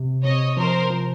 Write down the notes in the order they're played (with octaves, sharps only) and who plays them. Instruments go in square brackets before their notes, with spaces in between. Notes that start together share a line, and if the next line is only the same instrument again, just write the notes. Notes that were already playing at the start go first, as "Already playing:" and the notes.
Already playing: [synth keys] C3
[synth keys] C3 [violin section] C#5 D#5
[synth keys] F3 [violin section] A#4 C5
[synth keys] F3